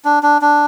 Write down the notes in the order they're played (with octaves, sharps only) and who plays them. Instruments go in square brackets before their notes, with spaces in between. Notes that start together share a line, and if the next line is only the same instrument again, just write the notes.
[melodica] D4
D4
D4